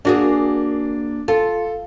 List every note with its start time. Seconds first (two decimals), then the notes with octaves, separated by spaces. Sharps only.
0.05 A#3 D4 F#4 G#4
1.28 F4 A4